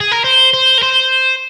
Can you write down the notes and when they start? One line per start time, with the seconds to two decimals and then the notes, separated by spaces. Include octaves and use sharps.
0.01 G#4
0.12 A#4
0.24 C5
0.54 C5
0.78 A#4
0.83 C5